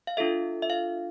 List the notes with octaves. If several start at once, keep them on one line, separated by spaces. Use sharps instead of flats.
F5
D4 F4 A4 E5
E5
F5